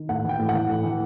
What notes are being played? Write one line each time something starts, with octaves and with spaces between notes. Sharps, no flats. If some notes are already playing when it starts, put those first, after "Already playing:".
Already playing: D#3
A2 F#5
E3 G5
A2
E3 F#5
A2
E3